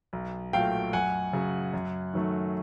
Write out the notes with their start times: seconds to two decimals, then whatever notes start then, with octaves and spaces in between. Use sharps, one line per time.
0.13 B1
0.53 A#2 F#3 A3 F5 G5
0.93 F#2 F#5 G#5
1.33 C#3 F#3
1.74 F#2
2.13 D#3 F#3 A3